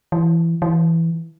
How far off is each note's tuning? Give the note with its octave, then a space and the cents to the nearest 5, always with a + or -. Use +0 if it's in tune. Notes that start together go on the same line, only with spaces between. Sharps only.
E3 +15
E3 +0